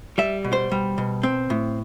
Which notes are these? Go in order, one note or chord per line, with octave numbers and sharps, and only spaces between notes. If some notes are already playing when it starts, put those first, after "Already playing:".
G3 E5
B2
C5
G3
B2
C4
A2